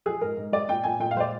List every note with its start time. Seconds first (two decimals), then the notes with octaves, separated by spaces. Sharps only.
0.06 F3 G#4
0.21 G#2 A#4
0.37 G#2
0.52 G#3 D5
0.69 A#2 G5
0.84 A#2 G#5
1.00 A#2 G5
1.11 F5
1.16 G#3 C5
1.20 D5